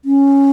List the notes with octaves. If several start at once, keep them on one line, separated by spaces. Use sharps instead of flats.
C#4